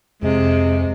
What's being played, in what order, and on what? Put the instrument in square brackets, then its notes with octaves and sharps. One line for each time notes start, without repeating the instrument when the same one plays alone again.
[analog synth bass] F2 [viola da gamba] C3 [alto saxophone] G#3